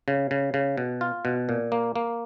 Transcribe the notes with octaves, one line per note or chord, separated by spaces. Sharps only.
C#3
C#3
C#3
B2
F4
B2
A#2
A#3
A#3